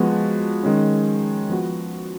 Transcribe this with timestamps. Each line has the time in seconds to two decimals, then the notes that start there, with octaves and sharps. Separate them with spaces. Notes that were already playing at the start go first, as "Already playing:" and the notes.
Already playing: F3 G#3 B3 F#4
0.63 D#3 G#3 C#4
1.49 F3 B3 F#4